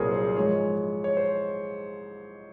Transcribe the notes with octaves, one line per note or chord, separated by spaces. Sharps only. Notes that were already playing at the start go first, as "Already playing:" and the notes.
Already playing: C2 A#2 F#3 G#4 A#4 C5 C#5
C5
G#2 F3 G#3 C#5
C#5
C5